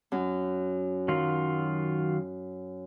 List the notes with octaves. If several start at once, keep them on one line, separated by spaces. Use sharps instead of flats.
F#2
D#3 F#3 F4